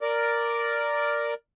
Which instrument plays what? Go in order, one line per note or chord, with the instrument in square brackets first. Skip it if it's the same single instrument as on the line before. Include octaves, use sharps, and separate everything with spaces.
[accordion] A#4 D5